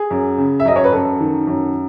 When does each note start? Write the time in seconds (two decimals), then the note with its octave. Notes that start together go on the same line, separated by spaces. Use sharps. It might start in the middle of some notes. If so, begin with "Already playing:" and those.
Already playing: G#4
0.10 F#2
0.38 C#3
0.60 E5
0.65 F#2 D#5
0.76 C#5
0.84 B4
0.92 F#2 A4
1.20 D#3
1.47 F#2